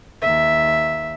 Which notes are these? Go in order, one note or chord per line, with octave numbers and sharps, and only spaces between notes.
D#2 E5